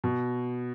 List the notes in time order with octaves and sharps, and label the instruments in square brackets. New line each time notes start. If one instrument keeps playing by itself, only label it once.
[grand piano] B2